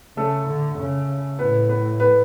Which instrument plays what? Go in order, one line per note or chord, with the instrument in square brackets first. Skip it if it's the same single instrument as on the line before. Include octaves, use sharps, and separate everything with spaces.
[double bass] C#3 [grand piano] A3 A4
[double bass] D3
C#3
[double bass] A2 [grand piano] B3 B4
[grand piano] B3 B4
B3 B4